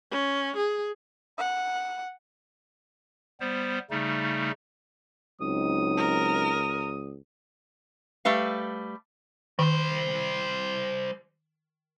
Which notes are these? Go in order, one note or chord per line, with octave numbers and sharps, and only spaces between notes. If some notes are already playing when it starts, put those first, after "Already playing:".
C#4
G#4
F#5
G3 B3 C5
C#3 G3 A3 D#4
C#2 F#3 C4 D#4 D#6
A#4
G3 A3 B4 F5
D#3 G3 C5